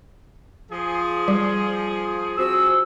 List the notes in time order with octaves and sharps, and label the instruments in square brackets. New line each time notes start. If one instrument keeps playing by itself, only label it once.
[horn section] F3 G#4
[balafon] G3
[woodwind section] C4 F#4 E6